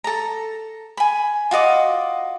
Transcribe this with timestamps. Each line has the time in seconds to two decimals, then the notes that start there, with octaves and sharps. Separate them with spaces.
0.04 A4 A#5
0.97 G#5 B5
1.51 F4 F#4 D#5 D6